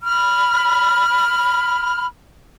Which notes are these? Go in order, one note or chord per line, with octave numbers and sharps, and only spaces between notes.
B5 F6